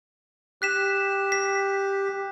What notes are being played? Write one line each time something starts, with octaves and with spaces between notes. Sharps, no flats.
G4 F#6 B6 E7
B6